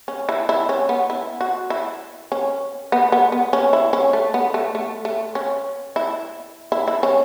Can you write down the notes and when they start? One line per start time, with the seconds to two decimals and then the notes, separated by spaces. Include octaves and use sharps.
0.08 C#4
0.29 E4
0.49 E4
0.69 C#4
0.89 B3
1.10 E4
1.41 F#4
1.70 E4
2.32 C#4
2.92 B3
3.12 B3
3.32 B3
3.53 C#4
3.73 E4
3.93 C#4
4.13 A3
4.34 B3
4.54 A3
4.75 A3
5.05 A3
5.35 C#4
5.96 E4
6.72 E4
6.88 E4
7.03 C#4